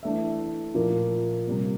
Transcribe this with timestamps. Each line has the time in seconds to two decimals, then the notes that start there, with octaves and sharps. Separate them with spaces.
0.03 E3 A3 D4 A4 E5
0.75 A#2 F3 A#3 F4
1.48 C3 G3 A#3